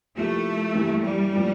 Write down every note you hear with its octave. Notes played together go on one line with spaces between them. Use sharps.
C3 F3 A3 A#3 E4
G2 E3 A#3 E4 G4
G3
A2 F3 A#3 D4